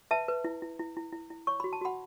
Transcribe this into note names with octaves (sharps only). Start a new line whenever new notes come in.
B4 E5 A5
B4
E4
E4
E4
E4
E4
E4
C#5 C#6
F#4 B5
A5
F#4 F#5 B5